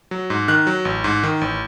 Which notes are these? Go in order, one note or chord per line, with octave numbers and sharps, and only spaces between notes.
F#3
G#2
D#3 F#6
F#3
A1
G#2
D#3
A1